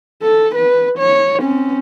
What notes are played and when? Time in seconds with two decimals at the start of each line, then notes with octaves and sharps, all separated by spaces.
0.23 A4
0.55 B4
0.98 C#5
1.42 C4 C#4